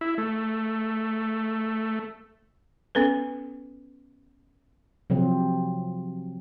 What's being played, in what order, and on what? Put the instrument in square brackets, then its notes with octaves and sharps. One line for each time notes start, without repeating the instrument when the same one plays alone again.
[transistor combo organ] E4
A3
[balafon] B3 C#4 A4 B4
[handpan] C3 F3 F#3 C4